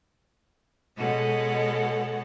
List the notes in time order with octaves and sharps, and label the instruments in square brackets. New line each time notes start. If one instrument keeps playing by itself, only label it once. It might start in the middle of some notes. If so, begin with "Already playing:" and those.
[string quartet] B2 G#3 A4 C#5 F#5